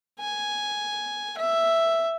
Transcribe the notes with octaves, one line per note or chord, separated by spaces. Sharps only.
G#5
E5